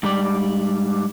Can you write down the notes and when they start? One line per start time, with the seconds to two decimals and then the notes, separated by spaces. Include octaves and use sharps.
0.03 G#2 G3 D5